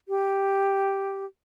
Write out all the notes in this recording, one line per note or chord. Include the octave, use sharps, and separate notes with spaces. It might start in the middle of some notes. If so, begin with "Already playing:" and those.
G4